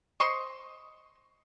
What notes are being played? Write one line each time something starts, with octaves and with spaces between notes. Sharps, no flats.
C5 D#5 C6 C#6